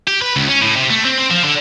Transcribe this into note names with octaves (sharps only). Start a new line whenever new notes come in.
G4
B4
C#2
C#4
A2
C3
A3
C4
C4
F3
D3